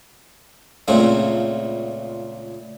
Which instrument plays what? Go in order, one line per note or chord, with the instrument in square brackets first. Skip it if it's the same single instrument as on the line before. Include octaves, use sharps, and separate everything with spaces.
[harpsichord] C#2 A#2 C#3 A3 C4